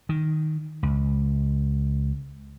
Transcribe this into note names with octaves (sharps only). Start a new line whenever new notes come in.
D#3
C#2